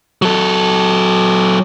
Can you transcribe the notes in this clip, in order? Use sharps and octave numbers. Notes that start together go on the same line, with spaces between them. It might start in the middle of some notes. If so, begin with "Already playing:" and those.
F#3 A4